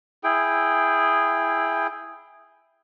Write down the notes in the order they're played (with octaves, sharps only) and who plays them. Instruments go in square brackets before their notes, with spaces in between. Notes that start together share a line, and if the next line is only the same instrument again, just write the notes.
[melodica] E4 G#4 G5